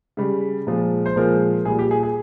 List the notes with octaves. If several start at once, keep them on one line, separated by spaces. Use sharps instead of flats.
C#3 G3
A#2 F3 G#3
C5
A#2 F3 G#3 A#4
A#2 G3 G#4
G4
G#4
G#4